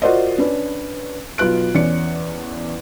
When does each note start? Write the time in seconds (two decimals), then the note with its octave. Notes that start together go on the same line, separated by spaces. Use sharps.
0.02 F4 F#4 A#4 C5 D5 D#5
0.38 C#4 D4 B4
1.38 B1 F4 B4 F#6 D7
1.75 E2 C#4 D5 C#7